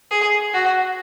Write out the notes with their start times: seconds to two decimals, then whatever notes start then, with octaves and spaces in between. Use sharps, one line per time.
0.11 G#4
0.53 F#4